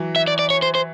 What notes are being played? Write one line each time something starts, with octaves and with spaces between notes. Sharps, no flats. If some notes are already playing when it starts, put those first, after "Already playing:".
Already playing: E3 F#3
E5
D5
D5
C#5
C5
C5